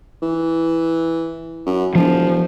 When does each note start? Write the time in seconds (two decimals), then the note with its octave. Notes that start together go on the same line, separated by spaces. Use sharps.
0.22 E3
1.66 F#2
1.95 E1 F3